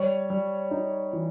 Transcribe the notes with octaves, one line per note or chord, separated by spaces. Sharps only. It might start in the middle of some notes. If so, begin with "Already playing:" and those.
Already playing: G3 C#5
G3
D#4
E3